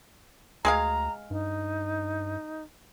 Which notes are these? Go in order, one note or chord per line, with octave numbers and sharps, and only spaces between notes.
D2 G#3 G#4 F5 A#5
G2 D#4